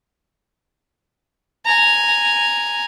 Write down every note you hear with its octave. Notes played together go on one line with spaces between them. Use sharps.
G#5 A#5